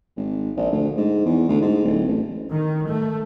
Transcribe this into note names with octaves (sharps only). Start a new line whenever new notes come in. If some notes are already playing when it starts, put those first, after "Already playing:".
G#1
A#1
D2
G#2
E2
D2
G#2
D1
A1
D#3
A3